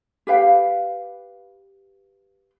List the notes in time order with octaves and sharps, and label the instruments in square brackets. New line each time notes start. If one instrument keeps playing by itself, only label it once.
[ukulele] G4 B4 F5 G5